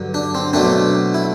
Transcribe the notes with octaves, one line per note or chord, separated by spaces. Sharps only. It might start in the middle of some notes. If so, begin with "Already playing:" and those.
Already playing: G2 D3 F#3
D4
C4
B2 F#3 A3 C4 D4
E4